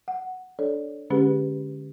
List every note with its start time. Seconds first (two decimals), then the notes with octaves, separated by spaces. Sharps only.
0.08 F#5
0.59 D4 A4 C#5 D5
1.10 D3 G#3 C#4 G4 G#4 B4